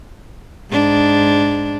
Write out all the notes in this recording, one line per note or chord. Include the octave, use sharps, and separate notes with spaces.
G#2 D4